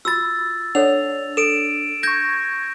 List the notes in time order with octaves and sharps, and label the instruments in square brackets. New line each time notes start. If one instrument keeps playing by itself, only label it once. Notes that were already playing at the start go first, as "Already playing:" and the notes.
[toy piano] F4 F#4 B5 [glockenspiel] E6 A6
[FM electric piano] D4 [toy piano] A4 C#5 F#5 [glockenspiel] F7
[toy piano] A4 [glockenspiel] D7 E7
[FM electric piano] C#6 G#6 [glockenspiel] G6 A#6